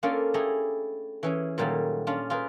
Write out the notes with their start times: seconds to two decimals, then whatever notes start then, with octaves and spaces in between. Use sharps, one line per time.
0.03 A#3 C#4 D4 F4 A4 A#4
0.34 A3 E4 G4 G#4 A#5
1.23 E3 C#4 G#4
1.58 A#2 D#3 F#3 G3 A3 A#3
2.07 C#4 D4 F4
2.30 F4 G#4 A#4 B4